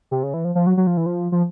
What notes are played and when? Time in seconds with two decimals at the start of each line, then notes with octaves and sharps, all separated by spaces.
0.11 C3
0.23 C#3
0.34 E3
0.45 F3
0.55 F3
0.67 F#3
0.77 F#3
0.87 F3
0.97 E3
1.06 F3
1.32 F3